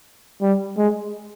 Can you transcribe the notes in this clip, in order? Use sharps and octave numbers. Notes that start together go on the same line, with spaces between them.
G3
G#3